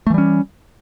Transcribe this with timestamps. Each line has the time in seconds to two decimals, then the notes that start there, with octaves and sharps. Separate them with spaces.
0.07 A3
0.10 E3
0.14 G3
0.18 C#4